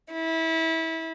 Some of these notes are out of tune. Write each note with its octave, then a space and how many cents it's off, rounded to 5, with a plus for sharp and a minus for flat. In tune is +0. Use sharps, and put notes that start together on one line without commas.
E4 -25